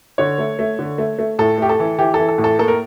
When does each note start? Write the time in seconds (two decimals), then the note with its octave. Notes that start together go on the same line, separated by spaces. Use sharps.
0.18 D3 C#5
0.38 A3
0.59 A3
0.79 D3
0.98 A3
1.19 A3
1.39 A2 A4
1.58 A3 G4
1.69 A4
1.79 E3
1.98 E3 G4
2.14 E3 A4
2.28 A4
2.38 A2
2.44 A4
2.59 A#3 A4
2.68 A#4